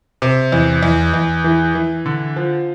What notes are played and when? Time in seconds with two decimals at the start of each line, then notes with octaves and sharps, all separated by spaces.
0.22 C3
0.52 E2
0.82 E2
1.14 E2
1.44 E3
1.75 E3
2.06 D3
2.36 F3